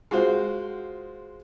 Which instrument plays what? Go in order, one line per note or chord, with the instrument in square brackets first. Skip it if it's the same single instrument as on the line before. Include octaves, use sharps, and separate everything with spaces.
[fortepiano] G#3 F4 F#4 C5